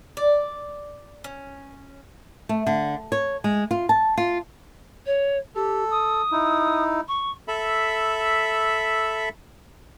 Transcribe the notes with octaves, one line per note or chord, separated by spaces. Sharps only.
D5
C#4
A3
D3
C#5
G#3
F4
A5
F4
C#5
G4 A4
D#6
D#4 E4
C#6
A4 E5 B5